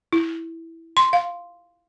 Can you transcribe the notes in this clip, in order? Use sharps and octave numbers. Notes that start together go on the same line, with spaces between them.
E4
C6
F5